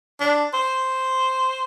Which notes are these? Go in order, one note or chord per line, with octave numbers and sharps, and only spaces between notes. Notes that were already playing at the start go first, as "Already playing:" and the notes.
D4
C5